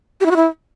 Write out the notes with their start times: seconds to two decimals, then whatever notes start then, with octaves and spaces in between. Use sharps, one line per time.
0.21 G4
0.26 E4
0.31 F#4
0.36 E4